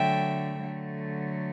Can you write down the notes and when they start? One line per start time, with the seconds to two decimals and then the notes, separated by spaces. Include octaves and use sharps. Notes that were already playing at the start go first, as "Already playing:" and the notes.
Already playing: D3 F#3 A3 E5 G5
0.57 D3 F#3 A3